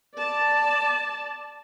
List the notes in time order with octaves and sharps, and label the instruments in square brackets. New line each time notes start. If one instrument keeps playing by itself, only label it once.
[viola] D5 A5